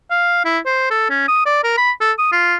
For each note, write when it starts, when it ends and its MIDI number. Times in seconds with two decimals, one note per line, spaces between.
0.11 0.44 77
0.45 0.59 64
0.66 0.88 72
0.91 1.08 69
1.10 1.27 61
1.28 1.41 87
1.46 1.61 74
1.64 1.78 70
1.78 1.92 83
2.01 2.12 69
2.19 2.31 87
2.32 2.56 65